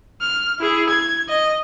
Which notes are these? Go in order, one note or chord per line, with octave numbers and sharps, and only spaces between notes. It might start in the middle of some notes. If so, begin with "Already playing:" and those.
F6
E4 G#4
G#6
D#5